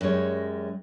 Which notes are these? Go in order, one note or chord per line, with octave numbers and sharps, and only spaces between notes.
F#2 G3 G#3 C#5